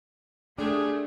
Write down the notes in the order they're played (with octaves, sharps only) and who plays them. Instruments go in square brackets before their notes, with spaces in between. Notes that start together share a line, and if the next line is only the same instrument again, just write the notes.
[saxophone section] G#3 G4 G#4 [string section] A3 [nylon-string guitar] D4